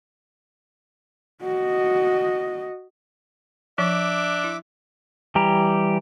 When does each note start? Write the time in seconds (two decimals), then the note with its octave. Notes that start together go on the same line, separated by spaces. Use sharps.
1.43 F#4 D#5
3.78 F3 D4 E5 D6
4.44 E4
5.35 E3 G3 G4 A#5